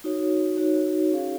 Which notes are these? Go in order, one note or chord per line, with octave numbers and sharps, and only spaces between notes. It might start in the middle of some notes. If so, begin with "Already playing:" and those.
D#4 F#4 C#5
D#4 F#4 C#5
C#4 G#4 C#5 F5